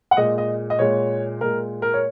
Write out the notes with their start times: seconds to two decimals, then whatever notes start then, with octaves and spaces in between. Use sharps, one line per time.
0.11 F#5
0.17 A#2 G#3 D#5
0.38 D#5
0.70 D#5
0.79 A#2 G#3 C#5
1.41 A#2 G#3 A#4
1.82 A#4
1.94 C#5